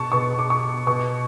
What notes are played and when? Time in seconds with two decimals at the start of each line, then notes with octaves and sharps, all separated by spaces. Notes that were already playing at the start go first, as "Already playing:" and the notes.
Already playing: B2 A5 C#6
0.12 B2 C#6
0.39 D6
0.50 C#6
0.87 B2 C#6